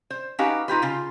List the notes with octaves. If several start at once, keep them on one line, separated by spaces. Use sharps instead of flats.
C5
C#4 D#4 F#4 G4 B4 F5
D#4 F4 G4 B4
C#3 F4